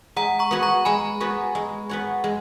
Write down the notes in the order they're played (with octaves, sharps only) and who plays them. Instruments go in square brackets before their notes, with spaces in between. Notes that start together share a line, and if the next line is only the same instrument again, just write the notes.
[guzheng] G#3 [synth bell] F#5 A#5
[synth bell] A#5 C#6
[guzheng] B3 F#4 C#5
[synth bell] A#5 C#6
[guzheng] G#3 [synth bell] G#5 B5
[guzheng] B3 F#4 C#5
G#3
B3 F#4 C#5
G#3